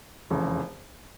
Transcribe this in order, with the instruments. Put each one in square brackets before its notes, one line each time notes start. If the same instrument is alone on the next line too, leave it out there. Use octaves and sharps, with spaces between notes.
[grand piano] F1 E2 C#3